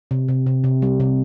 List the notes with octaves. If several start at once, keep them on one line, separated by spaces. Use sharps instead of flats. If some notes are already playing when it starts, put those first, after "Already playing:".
C3
C3
C3
C3
G3
C3